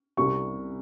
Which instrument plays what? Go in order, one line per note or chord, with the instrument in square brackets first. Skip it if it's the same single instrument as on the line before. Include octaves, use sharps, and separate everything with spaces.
[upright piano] C2 C3 G3 C#6